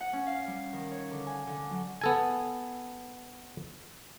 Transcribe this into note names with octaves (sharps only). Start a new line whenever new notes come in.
F#5
C#4
F5
G3
D#3
C#5
D3
G#5
D3
F#3
B3 A4 G#5